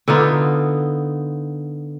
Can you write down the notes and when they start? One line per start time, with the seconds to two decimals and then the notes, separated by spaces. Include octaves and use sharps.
0.08 D3 B3 D#4 F4